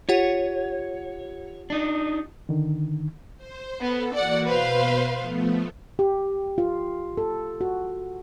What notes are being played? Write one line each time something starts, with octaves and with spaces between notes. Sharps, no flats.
F4 G4 C#5 F#5
D4 D#4
D3 D#3
C5
B3 A4
E3 A#3 F#4 D5 F#5
B2 B4 C5 F5 C6
F3 A3 B3
G4
F4
A4
F#4